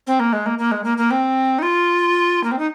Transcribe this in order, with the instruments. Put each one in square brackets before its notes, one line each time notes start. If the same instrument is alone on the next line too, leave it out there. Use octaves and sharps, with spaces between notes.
[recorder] C4
A#3
G#3
A#3
A#3
G#3
A#3
A#3
C4
D#4
F4
A#3
C4
D#4